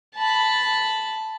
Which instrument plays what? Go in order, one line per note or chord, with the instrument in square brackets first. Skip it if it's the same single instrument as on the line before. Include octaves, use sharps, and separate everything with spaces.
[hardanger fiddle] A5 B5